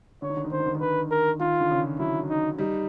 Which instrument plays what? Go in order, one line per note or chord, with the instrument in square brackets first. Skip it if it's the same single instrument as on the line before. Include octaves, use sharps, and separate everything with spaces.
[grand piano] D3 [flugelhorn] C#5
[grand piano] D#3
D3
D#3
[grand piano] D3 [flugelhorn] C5
[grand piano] D#3
D3
D#3
[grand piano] D3 [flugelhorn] B4
[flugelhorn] A#4
[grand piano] D#3 [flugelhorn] F4
[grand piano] D3
C#3
[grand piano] F#3 [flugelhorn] E4
[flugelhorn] D#4
[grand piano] G3 [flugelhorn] D#4